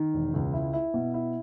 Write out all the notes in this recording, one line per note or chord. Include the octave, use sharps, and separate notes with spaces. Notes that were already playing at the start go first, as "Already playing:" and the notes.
Already playing: D#3
E1
C#2
E4
E4
B2
E4